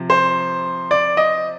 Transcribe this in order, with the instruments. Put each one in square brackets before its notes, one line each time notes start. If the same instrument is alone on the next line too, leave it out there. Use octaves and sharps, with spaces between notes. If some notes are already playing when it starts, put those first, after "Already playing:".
Already playing: [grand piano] C3 F3
C5
D5
D#5